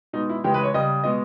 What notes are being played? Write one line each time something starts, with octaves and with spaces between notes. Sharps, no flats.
B2 G#3 D#4
E4
C#3 E3 G#3 G4
B4
C#5
C#3 G3 D#5
B2 G#3 D#5